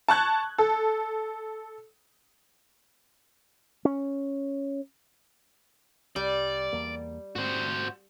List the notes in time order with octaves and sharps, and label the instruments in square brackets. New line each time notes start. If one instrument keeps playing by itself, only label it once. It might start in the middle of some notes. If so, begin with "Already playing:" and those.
[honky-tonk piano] A5 C#6 F#6 G#6
A4
[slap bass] C#4
[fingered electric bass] C2 [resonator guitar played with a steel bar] G3 [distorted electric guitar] D5
[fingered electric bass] E2 A#3
[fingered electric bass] G#2 C4 [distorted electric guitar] F#4 C5